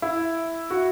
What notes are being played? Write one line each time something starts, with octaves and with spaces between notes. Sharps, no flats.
E4
F#4